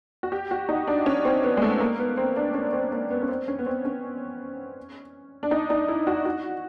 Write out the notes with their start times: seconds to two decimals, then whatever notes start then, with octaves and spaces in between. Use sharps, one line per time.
0.23 F#4
0.32 G4
0.51 F#4
0.69 D#4
0.87 D4
1.06 C#4
1.25 C4
1.44 B3
1.57 G#3
1.62 A3
1.80 A#3
1.99 B3
2.17 C4
2.36 D4
2.54 C#4
2.73 C4
2.92 A#3
3.10 B3
3.22 C#4
3.28 C4
3.48 C#4
3.59 B3
3.66 C4
3.85 C#4
5.43 D4
5.51 D#4
5.70 D#4
5.88 E4
6.07 F#4
6.25 F#4